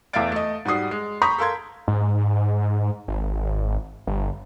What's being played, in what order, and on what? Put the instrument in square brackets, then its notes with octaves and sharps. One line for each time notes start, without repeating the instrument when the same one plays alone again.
[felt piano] E2 A3 E5 F5 A6 D7
A3 D#5
G#2 G3 F#4 D#6 C7
G#3
A#5 B5 C#6 D#6 G6 B6
A4 A#4 F5 C6 G#6
[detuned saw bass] G#2
G#1
G1